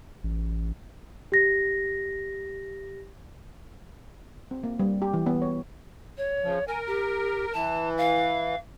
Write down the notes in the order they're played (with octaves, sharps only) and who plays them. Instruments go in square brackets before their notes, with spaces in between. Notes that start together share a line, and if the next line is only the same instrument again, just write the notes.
[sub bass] A1
[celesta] G4 A#6
[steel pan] C4
A#3
G3
G4
E3
B3
C#5
[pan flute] C#5
[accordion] C#3 F3
[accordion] A#4 [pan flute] G#5
[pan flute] G4
[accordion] E3 [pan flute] A5
[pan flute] F5